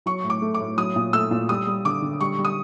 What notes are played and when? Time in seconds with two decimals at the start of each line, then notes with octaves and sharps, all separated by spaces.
0.06 F#3 C#6
0.24 A2
0.30 D6
0.42 A3
0.54 D6
0.60 A2
0.77 F#3 D#6
0.96 A#2
1.13 A3 E6
1.31 A#2
1.49 G3 D#6
1.67 G3
1.85 D3 D6
2.02 D3
2.20 G3 C#6
2.39 G3
2.45 D#6